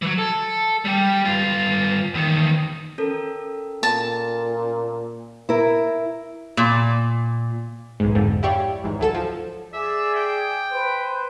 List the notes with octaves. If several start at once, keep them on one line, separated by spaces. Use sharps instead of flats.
E3 F#3
A4
G3 G4
G2 F4
E2 D#3
C#4 A4 A#4
A#2 A5
E4 A#4
A#2
B1 G#2
F2 G#2 D3
E4 G4 C#5 D5 F5
G#1 E2 G#2
D2 F#3 A4 E7
F3
G#4 D5 E5
G5
B4 C5